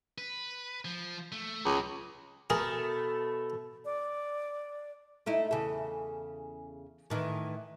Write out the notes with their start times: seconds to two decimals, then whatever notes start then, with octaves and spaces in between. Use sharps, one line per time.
0.18 B4
0.85 F3
1.32 A3
1.65 C#2 F#3 D#4
2.50 B2 A3 G#4 A#4
3.85 D5
5.26 A3 D#4 E4
5.51 E2 C#3 A4
7.10 A2 D#3 E3